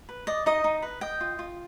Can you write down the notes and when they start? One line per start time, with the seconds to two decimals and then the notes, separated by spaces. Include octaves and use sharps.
0.09 B4
0.27 D5 D#5
0.46 D#4 D#5
0.64 D#4
0.82 B4
1.01 D#5 G5
1.21 F4
1.39 F4